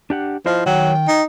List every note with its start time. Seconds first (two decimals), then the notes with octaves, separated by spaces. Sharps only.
0.10 D4 G4 F#5
0.46 F3 E4 C5 D#5
0.66 D#3 F#3 G5
1.08 D#4